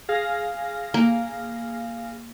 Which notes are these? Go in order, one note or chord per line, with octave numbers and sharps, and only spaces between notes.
G#4 F5 A#6
A#3